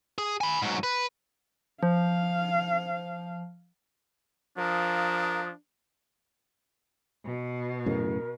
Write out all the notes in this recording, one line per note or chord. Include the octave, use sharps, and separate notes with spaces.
G#4
G#5 B5
G#2 F#3
B4
F3 F5
F3 D4 A#4 F5 D#6
B2
F#2 A2 C#3 A#4